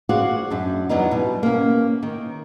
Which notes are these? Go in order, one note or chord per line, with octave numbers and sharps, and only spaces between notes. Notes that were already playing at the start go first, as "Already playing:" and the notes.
F#4 G#4 C5 D5 F5 F#5
F#2 D4
E2 F#3 B3 D4 D#4
B2 G3
A#3 C#4
D#3